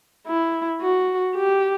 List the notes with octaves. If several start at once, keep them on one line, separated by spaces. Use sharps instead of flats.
E4
F#4
G4